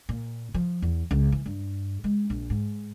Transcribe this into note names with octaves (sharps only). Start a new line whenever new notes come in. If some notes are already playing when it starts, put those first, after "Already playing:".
A#2
F3
E2
C#2
E3
G2
G#3
A#1
G#2